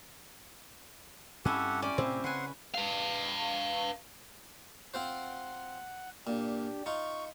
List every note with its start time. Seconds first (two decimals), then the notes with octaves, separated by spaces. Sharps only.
1.45 G2 C4 C#4 E4 G4 A4 E5 F#5
1.82 C#4 G4 D5
1.98 A2 C3 A3 C4 E4
2.24 C#3 B4 F#5 G#5 C6
2.74 B4 F5
4.94 C4 F4 C5 F#5
6.27 A#2 D4 G4
6.86 D#4 F4 C#6